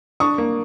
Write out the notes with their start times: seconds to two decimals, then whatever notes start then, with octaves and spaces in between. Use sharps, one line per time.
0.20 D4 C#6 D#6
0.38 A#3